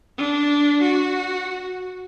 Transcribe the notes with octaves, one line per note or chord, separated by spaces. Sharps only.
D4
F#4